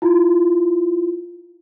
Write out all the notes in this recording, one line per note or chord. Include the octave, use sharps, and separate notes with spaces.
E4 F4